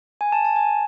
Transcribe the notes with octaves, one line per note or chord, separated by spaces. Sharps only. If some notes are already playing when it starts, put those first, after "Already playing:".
G#5
A5
A5
G#5